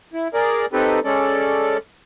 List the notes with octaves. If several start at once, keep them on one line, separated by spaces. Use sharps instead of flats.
E4
G#4 A#4 D5
C4 D#4 G4 A4 B4
G#3 C#4 A4 D5